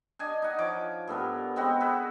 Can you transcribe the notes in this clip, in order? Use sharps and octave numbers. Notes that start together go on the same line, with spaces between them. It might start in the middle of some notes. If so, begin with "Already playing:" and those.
D4 D#5 G#5
D#4 F#5
F3 C#5 D6
G2 A3 B3 A#4
G#3 B3 C4 F#4
F#4 G#4 B4 E5